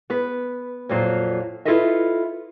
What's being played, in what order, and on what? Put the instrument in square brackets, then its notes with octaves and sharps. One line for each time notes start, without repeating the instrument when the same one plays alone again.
[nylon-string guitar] B3 B4
F2 A#2 F#3 F4
E4 F4 A4 B4 D#5 E5